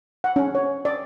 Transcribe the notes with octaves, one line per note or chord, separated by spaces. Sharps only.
F#5
C#4
C#5
D5